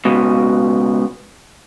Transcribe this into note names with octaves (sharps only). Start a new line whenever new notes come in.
C#2 B2